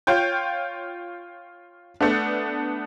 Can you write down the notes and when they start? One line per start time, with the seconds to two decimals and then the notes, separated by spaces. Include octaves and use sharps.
0.07 F4 C#5 G5 G6
2.01 A3 B3 D4